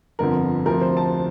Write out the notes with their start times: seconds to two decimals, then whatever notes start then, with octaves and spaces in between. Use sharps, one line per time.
0.19 G1 F2 D3 F3 A#4
0.66 D2 C3 F3 A#4
0.81 C5
0.97 A5